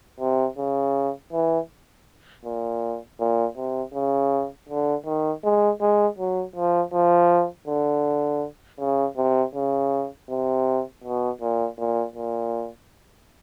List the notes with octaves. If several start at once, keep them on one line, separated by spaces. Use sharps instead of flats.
C3
C#3
E3
A#2
A#2
C3
C#3
D3
D#3
G#3
G#3
F#3
F3
F3
D3
C#3
C3
C#3
C3
B2
A#2
A#2
A#2